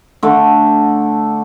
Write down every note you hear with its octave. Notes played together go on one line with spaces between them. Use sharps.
D3 A3